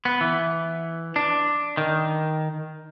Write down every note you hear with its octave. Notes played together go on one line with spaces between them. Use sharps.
B3
E3
D4
D#3